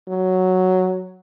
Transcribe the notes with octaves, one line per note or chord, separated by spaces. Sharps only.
F#3